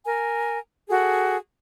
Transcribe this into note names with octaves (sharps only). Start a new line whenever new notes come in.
A#4 G#5
F#4 G#4 A4